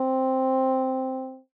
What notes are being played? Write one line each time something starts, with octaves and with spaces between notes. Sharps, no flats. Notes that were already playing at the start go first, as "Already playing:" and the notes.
Already playing: C4